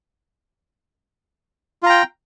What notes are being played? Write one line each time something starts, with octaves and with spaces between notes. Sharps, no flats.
F4 G5 A#5